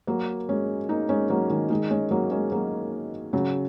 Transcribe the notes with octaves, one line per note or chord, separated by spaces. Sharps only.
F#3 A#3
G#3 C#4
A#3 D#4
G#3 C#4
F#3 A#3
D#3 G#3
D#3 G#3
G#3 C#4
F#3 A#3
G#3 C#4
F#3 A#3
C#3 F#3